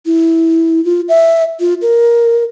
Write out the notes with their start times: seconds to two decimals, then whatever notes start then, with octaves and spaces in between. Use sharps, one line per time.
0.06 E4
0.85 F4
1.09 E5
1.60 F4
1.82 A#4